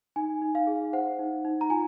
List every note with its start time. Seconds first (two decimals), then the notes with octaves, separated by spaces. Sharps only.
0.16 D#4 G#5
0.42 D#4
0.55 F5
0.67 G#4
0.93 C5 F#5
1.19 D#4
1.45 D#4
1.61 A#5
1.70 F4 G#5